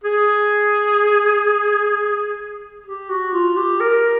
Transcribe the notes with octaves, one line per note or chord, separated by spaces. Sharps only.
G#4
G4
F#4
F4
G4
A#4